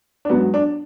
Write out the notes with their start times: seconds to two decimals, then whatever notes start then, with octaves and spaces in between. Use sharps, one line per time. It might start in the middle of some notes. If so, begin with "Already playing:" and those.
0.25 D4
0.29 G#2 F#3 B3
0.54 D4